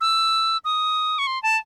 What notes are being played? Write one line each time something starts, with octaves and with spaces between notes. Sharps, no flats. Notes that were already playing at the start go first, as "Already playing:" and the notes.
E6
D#6
C#6
C6
A5